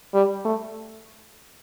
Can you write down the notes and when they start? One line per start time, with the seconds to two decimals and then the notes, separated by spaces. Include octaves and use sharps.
0.14 G3
0.45 A3